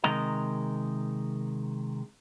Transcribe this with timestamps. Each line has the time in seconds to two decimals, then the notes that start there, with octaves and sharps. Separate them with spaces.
0.04 C3 D#3 G#3 A#4 D#5 A#5